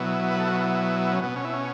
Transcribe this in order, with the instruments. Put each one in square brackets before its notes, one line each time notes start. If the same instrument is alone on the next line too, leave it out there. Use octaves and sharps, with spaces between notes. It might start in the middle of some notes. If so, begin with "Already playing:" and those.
Already playing: [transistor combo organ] B2 F#3 B3 E4
B4
A4
F#4
E4
C#4
B2 B3
C#4
E4
C#4